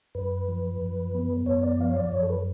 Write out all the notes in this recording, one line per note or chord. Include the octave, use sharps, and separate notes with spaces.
F#2 B4
F3
F#2
B3
F#2 C#5
D5
F3 F5
C#5
D5
F#2 C#5
A4
B4